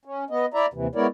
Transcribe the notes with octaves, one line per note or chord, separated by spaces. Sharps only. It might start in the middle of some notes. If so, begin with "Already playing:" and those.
C#4
B3 D#5
E4 D5 E5 A#5
D#2 C3 E3
G#3 B3 E4 A#4 C#5 D5